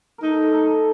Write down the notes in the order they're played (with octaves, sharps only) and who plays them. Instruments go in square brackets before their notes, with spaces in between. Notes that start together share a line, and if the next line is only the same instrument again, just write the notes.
[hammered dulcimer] A3 A4 A#4 [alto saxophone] D#4
[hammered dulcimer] A3 A4